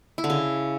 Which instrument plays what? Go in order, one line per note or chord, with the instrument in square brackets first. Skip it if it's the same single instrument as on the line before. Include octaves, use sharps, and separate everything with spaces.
[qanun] E4
D3
C#3